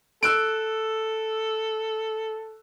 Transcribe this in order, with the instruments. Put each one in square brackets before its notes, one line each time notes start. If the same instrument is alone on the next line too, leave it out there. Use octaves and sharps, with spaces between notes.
[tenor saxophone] A4 [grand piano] E6 F#6 D7